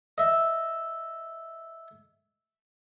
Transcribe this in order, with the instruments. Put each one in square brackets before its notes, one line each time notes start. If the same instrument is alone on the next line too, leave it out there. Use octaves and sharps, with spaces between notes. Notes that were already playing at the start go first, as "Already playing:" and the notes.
[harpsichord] D#5 E5